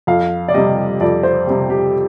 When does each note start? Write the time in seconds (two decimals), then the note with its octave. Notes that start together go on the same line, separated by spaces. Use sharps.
0.07 F2 F5
0.48 D5
0.54 C3 G3 D#5
1.00 F2 D5
1.23 C5
1.47 C3 G3
1.70 G4